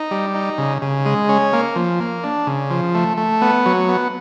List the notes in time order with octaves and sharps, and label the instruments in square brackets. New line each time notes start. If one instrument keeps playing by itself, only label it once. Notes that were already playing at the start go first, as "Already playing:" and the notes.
Already playing: [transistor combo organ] D#4
G3
D#4
C#3
C#3
G#3
C#4
A#3
F3
A#3
D4
C#3
F3
A3
A3
B3
F#3
B3